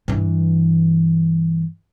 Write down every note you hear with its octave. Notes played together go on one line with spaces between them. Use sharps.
G2 E3